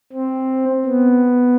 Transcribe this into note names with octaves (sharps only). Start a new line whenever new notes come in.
C4
B3